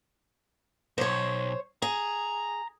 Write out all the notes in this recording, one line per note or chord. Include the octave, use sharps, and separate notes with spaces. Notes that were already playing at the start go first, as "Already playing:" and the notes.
B1 C5 C#5
G#4 A#5